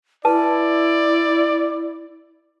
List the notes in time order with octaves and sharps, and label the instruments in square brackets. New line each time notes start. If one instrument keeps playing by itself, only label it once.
[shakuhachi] E4 [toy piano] B4 A5 [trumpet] D5